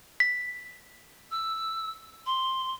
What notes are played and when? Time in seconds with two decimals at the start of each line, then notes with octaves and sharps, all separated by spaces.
0.20 B6
1.31 E6
2.26 C6